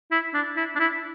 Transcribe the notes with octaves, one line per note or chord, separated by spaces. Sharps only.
E4
D4
E4
D4
E4